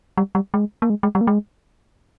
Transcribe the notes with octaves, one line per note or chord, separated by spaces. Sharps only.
G3
G3
G#3
A#3
G#3
G#3
G3
A#3
G#3